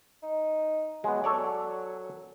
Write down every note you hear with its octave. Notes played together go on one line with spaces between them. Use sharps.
D#4
F#3 G#3 B3
A4 C#5 D5